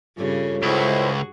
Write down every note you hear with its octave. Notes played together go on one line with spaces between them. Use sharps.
G2 C#3 G3 F4 A4 C#5
C#2 E4 F#4 G#4 C5 D#5